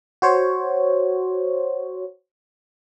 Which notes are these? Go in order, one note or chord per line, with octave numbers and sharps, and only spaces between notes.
F#4 C5 C#5